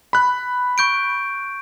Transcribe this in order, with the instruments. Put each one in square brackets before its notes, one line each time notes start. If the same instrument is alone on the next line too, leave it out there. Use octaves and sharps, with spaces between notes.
[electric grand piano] B5 F#6
[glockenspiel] C#6 G6 D7